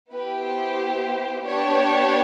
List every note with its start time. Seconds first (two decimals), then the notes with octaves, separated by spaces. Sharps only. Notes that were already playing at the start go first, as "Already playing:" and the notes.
0.12 B3 E4 G4 B4
0.45 C5
1.44 B3 D4 G4 C#5